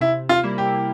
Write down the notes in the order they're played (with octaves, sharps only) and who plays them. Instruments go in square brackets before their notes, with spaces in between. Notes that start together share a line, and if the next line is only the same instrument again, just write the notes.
[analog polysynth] C3 [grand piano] E4
[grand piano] F4
[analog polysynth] G3 A#3 E4
[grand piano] G4